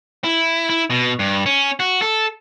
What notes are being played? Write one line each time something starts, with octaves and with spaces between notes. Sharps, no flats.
E4
E4
B2
G2
C#4
F#4
A4